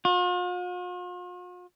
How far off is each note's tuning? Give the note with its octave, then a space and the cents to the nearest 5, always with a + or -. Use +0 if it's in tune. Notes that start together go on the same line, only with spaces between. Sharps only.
F4 +45